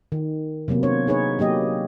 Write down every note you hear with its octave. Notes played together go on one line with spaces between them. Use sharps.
D#3
C3 F#3 A#3 B3
D4 C5 C#5
D#4 G#4 B4 C#5
F#3 A#3 G4 D#5